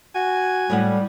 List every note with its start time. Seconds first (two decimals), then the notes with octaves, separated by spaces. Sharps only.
0.15 F#4 G#5
0.70 A2 G3 G#3 F#5